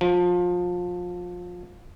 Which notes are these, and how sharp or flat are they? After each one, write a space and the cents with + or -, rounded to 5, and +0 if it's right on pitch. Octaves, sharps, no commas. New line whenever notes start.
F3 +25